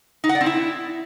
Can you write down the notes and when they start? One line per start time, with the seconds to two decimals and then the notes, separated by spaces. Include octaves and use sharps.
0.24 D#4
0.29 F#5
0.35 D5
0.41 C4
0.46 E4